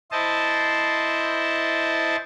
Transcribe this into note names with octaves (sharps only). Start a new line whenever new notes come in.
E4 C5 D#5 A5